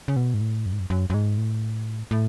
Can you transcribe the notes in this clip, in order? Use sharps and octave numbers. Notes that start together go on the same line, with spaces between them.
C#3
B2
G#2
A2
F#2
G#2
F#2
F#2
F#2
G#2
A2
A2